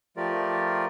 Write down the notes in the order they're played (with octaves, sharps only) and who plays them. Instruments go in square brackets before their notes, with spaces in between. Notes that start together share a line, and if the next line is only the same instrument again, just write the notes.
[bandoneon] F3 A3 F4 G4 A#4 D5